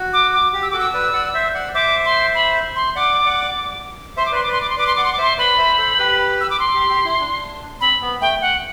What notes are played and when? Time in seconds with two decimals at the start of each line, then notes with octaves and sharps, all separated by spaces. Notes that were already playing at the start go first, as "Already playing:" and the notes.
Already playing: F#4
0.13 D6
0.33 D6
0.53 G4
0.62 E6
0.71 F#4 A4 D6
0.79 E6
0.94 B4 D5
1.14 D5 F#5
1.34 C5 E5
1.54 D5 F#5
1.74 C5 E5 D6
2.05 C6
2.35 B5
2.76 C6
2.95 D5 F#5 D6
3.26 D5 F#5
4.17 C5 E5 C6
4.26 D6
4.32 B4 D5 C6
4.43 D6
4.48 B4 D5 C6
4.61 D6
4.70 C6
4.77 B4 D5 D6
4.87 C6
4.95 D5 F#5 D6
5.04 C6
5.13 D6
5.18 C5 E5 C6
5.38 B4 D5 B5
5.58 C5 E5
5.78 A4 C5
5.98 G4 B4
6.41 E6
6.50 D6
6.60 C6
6.75 G4
6.90 G4
7.05 E4
7.20 D4
7.81 C4 B5
8.02 B3
8.21 A3 G5
8.41 F#5